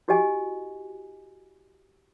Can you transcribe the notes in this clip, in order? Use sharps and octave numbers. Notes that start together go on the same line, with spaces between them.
E4 F#4 G4 D#5 G#5